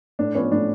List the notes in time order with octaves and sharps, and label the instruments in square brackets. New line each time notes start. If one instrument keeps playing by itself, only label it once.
[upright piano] A2 D4
F3 B3 C#4
A2 D4